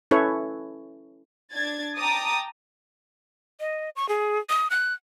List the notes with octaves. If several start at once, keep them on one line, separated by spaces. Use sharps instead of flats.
C#4 E4 A4 B4 C#5
D4 G#6 A6
G5 A5 A#5 D6 D#6 A6
D#5
C#6
G#4
D#6
F#6